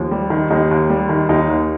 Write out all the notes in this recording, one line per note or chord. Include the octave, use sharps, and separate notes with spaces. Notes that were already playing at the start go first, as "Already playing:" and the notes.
Already playing: D#2 F3
G3
D#3
D#2 D#3 D#4
D#2
G3
D#3
D#2 D#3 D#4
D#2